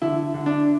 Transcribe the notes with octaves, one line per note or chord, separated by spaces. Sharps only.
D3 E4
D3
D4